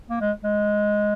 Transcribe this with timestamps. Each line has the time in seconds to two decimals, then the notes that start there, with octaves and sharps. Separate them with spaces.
0.10 A#3
0.21 G#3
0.43 G#3